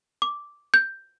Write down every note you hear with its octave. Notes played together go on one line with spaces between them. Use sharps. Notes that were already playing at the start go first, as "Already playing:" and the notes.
D6
G6